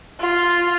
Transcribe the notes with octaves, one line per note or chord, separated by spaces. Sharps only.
F4